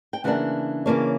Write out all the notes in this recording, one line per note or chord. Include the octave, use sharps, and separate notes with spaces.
G5
C#3 E3 A#3 D4 F#5
C#3 E3 A#3 D4 C#5